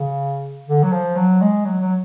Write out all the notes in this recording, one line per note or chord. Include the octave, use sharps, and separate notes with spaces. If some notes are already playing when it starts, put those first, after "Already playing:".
Already playing: C#3
D3
F#3
F3
F#3
G#3
F#3
F#3